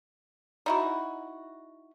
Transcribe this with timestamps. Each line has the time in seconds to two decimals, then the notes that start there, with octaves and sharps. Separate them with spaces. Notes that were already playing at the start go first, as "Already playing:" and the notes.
0.66 D#4 E4 F#4